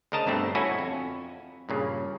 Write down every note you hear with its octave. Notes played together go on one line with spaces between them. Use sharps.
D2 C#3 A#4 D#5 A5 A#5
G2 B2 D3 A3 C4
C#4 E4 F#4 A4 G#5
F2
G2 A#2 C#3